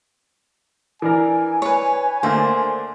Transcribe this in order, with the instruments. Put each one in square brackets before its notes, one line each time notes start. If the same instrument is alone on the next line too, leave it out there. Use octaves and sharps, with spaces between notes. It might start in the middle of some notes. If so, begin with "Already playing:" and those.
[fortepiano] E3 D4 A#4 [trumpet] G#5
[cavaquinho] B4 C#5
[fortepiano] D3 A3 A#3 [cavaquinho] C5